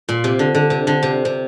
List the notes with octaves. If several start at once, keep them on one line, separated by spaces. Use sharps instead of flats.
A#2
C3
D3
D3
C3
D3
C3
C3